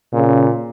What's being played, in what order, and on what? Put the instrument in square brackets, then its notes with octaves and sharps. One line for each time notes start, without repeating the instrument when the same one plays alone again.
[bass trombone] A#2 [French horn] C#3